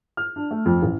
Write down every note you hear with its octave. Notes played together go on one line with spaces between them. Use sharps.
F6
D4
A3
F2
A1